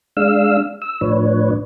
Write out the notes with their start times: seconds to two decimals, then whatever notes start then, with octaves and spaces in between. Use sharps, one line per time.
0.17 G#3 D4 F5 E6
0.82 E6
1.01 A2 F3 D4 B4 C#5